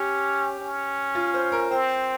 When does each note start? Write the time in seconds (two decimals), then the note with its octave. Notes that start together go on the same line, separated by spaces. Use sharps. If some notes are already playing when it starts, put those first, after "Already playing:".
Already playing: C#4 G4
0.60 C#4
1.15 F4
1.34 C5
1.52 A#4
1.71 C4 C5